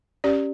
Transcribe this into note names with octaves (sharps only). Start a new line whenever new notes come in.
C#4 G4 D5